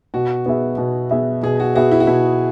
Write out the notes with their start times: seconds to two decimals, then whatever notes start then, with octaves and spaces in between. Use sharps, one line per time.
0.14 B2 F#4
0.46 B3 G#4 E5
0.78 B2
1.11 B3 G#4 E5
1.43 B2 G#4
1.60 F#4
1.75 B3 F#4 G#4 E5
1.91 E4
2.00 F#4
2.07 B2 E4